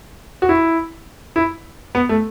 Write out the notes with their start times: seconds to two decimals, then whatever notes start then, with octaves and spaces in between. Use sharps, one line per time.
0.42 F#4
0.49 E4
1.36 E4
1.95 B3
2.09 A3